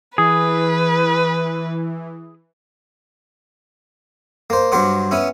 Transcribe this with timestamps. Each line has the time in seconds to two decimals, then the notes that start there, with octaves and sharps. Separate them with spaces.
0.18 E3 G#4 B4
4.50 A#3 C5
4.72 G2 F#3 C5 F#5 D6
5.11 B3 C#4 E4